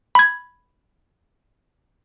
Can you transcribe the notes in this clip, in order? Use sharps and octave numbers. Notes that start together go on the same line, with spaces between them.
B5 G#6